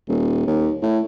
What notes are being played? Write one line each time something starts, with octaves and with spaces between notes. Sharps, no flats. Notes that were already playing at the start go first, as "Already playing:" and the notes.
D#1
D#2
A2